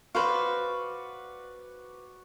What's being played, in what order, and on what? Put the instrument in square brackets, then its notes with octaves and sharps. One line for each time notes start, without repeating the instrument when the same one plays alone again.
[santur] F#4 D5 [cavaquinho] B4 C5 F5